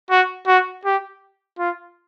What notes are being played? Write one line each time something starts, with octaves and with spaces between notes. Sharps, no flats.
F#4
F#4
G4
F4